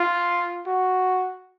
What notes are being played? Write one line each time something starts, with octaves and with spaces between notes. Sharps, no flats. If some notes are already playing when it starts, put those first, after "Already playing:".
Already playing: F4
F#4